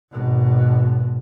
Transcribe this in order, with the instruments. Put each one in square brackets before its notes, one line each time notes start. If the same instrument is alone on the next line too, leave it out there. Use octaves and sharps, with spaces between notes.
[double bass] G#1 B2